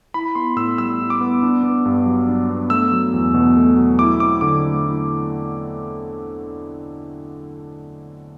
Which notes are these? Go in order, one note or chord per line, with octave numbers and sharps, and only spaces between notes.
E4 B5
B3 C6
A2 E6
G3 E6
E4
D6
B3
D4
B3
G2
F#3
D4
B3
A3 E6
F#3
E2
B2
A3
F#3
E4 D6
C4 D6
D3 D6
A3
E4